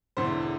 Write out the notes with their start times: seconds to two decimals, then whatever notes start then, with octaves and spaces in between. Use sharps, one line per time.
0.17 E1 E2 D3 C5